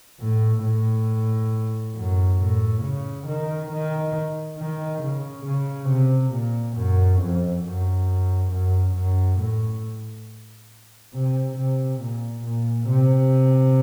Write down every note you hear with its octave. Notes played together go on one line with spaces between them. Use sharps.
A2
A2
F#2
A2
C#3
D#3
D#3
D#3
C#3
C#3
C3
A#2
F#2
F2
F#2
F#2
F#2
A2
C3
C3
A#2
A#2
C3